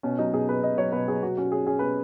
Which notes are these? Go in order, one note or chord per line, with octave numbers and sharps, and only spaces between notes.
B2 C#4
F#3 D#4
B2 G#4
B2 B4
B2 D#5
F#3 C#5
B2 B4
F#3 G#4
B2 F#4
C#4 F#4
C#4 G#4
C#4 G#4
B2 B4